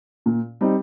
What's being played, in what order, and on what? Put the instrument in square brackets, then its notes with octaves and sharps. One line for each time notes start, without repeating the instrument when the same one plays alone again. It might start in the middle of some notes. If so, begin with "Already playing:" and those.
[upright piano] A#2
G3 C4 D#4